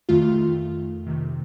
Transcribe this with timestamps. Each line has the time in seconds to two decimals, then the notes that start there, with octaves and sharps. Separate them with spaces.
0.09 F2 D#3 A3 F4
1.06 C3 D#3 A3